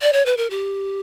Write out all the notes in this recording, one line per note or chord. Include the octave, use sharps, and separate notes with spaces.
D5
C#5
B4
A#4
G4